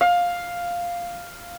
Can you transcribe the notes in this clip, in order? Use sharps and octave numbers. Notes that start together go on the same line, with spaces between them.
F5